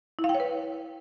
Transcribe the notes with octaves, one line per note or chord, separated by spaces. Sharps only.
E4
F5
G5
C#5
B4